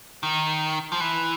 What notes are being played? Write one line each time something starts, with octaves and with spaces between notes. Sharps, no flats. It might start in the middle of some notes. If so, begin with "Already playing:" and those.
D#3
F3
E3